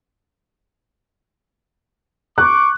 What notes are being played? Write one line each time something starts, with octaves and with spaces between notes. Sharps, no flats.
C#6 D6 F#6